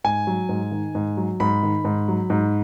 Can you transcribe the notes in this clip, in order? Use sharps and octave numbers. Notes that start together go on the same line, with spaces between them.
G#2 G#5
F#3
G#2
D#3
G#2
F#3
G#2 B5
D#3
G#2
F#3
G#2